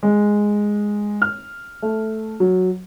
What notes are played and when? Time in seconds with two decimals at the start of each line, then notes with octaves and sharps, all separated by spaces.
0.03 G#3
1.22 F6
1.82 A3
2.40 F#3